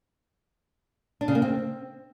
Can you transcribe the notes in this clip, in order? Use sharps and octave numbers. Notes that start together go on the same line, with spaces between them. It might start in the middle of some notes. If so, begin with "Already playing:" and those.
D4
C#3
A#3
C4